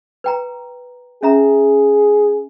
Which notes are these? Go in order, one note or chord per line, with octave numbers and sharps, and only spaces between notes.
B4 G5 A#5
C#4 G#4 E5 A#5